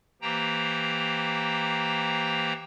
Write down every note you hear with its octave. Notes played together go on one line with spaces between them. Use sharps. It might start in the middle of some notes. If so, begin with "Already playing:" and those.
E3 A#3 G4 C5 G5 A#5